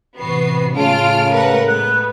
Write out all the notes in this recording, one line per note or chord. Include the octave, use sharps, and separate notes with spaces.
A2 C3 E3 B3 F#4 C7
A2 C#3 G#3 A3 F4 A5 F6 D7
A#4 B4 F#5
B3 F#6